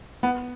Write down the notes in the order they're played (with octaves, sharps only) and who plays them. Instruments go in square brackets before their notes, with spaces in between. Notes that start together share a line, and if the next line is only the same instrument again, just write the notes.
[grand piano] B3